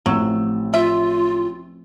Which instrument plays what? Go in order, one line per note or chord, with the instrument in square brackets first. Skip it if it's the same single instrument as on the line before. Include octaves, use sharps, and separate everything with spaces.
[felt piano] A1 E6 [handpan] F3 A3 C4 [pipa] F#3
[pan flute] F4 [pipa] E5